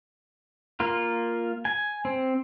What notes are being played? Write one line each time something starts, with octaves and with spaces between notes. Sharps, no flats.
A#3 F4
G#5
C4